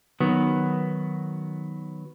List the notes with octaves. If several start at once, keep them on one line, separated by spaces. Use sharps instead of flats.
D#3 F#3 B3